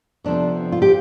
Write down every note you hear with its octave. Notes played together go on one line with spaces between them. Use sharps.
F2 C3 F3 B3 D4
F4
G4